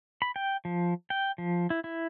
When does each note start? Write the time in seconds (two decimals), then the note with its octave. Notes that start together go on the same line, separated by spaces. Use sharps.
0.22 B5
0.36 G5
0.65 F3
1.10 G5
1.38 F3
1.70 E4
1.84 E4